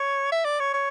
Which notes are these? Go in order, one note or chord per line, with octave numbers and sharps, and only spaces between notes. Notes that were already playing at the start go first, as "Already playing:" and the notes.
Already playing: C#5
E5
D5
C#5
C#5